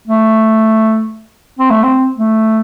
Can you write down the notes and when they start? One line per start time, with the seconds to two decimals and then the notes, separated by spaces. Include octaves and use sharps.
0.08 A3
1.59 C4
1.70 A3
1.83 C4
2.15 A3